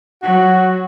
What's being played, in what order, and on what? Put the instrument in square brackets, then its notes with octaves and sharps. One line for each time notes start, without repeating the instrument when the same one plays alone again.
[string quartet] F#3 [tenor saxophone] F#4